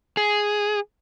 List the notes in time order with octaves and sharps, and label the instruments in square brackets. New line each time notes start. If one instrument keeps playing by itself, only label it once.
[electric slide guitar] G#4